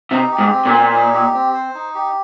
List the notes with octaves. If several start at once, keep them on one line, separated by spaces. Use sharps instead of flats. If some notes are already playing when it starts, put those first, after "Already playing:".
C3 D#4
G4
G#2
C4
A#2
C5
D#4
G4
C4
C5
D#4
G4